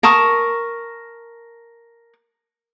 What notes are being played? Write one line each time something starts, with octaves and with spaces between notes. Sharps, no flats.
A#4 A5 C#6 D#6